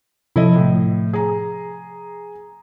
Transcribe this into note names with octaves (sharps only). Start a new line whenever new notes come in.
C3 F3 E4 A4 D#5
A2
G#4 A#5